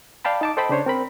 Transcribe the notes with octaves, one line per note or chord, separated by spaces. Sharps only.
D5 F5 G5 A5 B5
D#4 A5 D6
A4 C5 D#5 G5 A5 B5
C#3 D4 C5 C#5
C4 A#4 B5